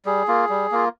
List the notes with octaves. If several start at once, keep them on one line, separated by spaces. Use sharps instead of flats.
G3 G#4
A#3 F4
G3
A#3 F4